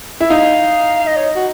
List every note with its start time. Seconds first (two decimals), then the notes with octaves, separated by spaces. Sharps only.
0.20 E4
0.30 D#4 F5
1.07 D#5
1.17 C#5
1.36 F#4